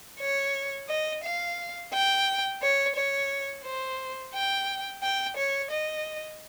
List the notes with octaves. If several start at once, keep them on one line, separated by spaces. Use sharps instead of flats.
C#5
D#5
F5
G5
C#5
C#5
C5
G5
G5
C#5
D#5